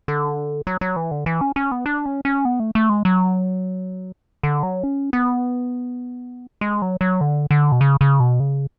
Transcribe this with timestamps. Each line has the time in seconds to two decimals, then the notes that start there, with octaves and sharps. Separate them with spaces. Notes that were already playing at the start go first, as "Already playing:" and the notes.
0.08 D3
0.67 F#3
0.81 F#3
0.96 E3
1.11 D3
1.26 E3
1.41 C#4
1.56 C#4
1.72 B3
1.86 D4
2.06 C#4
2.25 C#4
2.45 B3
2.60 A3
2.75 A3
2.90 G#3
3.05 F#3
4.43 D3
4.63 F#3
4.83 C#4
5.13 B3
6.61 G#3
6.82 F#3
7.01 F#3
7.21 D3
7.51 D3
7.72 B2
7.81 C#3
8.01 C#3
8.20 B2
8.40 C#3